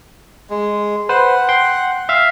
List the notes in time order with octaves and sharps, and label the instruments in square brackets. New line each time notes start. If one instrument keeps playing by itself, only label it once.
[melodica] G#3
[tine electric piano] B4 C5 [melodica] F#5
[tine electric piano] G5 C6
E5 F5